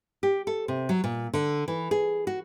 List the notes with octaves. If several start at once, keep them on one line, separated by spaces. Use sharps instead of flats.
G4
A4
C3
F#3
A#2
D3
E3
G#4
F#4